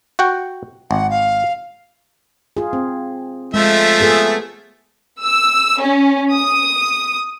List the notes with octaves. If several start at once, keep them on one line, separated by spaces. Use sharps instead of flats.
F#4 F#5 G5
G#1 F#5
F5
F4 G#4
C4
F3 G#3 A3 E5
B3 G#4 A4
E6
C#4
D#6